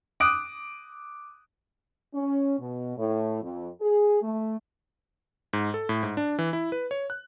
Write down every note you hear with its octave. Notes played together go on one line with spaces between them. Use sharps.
D6 D#6 F#6 D7
C#4
B2
A2
F2
G#4
A3
G#2
A4
A2
G#2
D4
E3
E4
B4
C#5
F#6